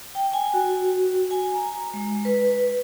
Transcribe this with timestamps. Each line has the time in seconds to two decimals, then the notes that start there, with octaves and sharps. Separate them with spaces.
0.15 G5
0.33 G#5
0.54 F#4
1.31 G#5
1.55 A#5
1.93 G#3
2.25 B4